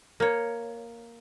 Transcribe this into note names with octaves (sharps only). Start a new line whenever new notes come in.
A#3 C#5